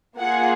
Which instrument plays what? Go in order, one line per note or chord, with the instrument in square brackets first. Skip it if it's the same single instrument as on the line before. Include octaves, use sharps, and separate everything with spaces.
[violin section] A#3 F4 G#4 F#5